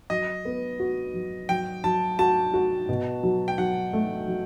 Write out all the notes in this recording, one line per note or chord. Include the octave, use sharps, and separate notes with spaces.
F#3 D#5
B3
F#4
F#3
F#3 G5
F#3 A5
F#4 A5
F#4
B2
F#3
G5
F#3 F#5
A3
F#3